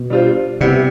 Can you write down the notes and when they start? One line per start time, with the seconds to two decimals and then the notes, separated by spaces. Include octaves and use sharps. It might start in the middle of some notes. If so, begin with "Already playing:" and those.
Already playing: B2
0.10 G3 D4 F4 C5
0.61 C3 G3 B3 E4